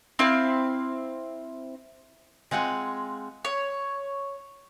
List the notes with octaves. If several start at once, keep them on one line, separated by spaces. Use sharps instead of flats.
C4 E4 F5
G#3 C4 F4 F#5 G#5
C#5